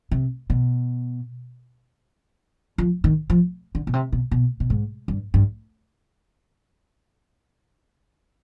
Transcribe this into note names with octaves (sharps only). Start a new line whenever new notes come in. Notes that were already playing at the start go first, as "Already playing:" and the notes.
C3
B2
F3
D#3
F3
D3
B2
C3
B2
B2
B2
G#2
G2
G2